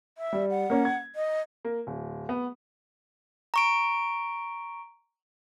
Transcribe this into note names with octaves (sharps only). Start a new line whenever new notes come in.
E5
G3
F#5
A#3 C#4
G#6
D#5
A#3
D1
B3
A#5 C#6 D7